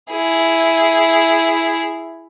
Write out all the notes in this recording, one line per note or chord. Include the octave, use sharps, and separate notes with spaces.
E4 G#4